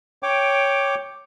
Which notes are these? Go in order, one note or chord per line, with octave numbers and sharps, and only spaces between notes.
C#5 G5 D6